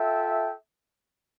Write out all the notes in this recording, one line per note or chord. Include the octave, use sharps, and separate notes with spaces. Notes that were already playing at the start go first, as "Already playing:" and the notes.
Already playing: F4 A4 E5 G5